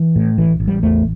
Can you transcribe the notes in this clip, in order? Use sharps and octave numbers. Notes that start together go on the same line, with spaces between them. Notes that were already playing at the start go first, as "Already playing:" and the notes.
Already playing: E3
A2
A1 E3
A1
G3
E2 A3